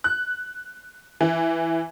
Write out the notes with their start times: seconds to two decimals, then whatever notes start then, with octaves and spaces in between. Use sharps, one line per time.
0.04 F#6
1.21 E3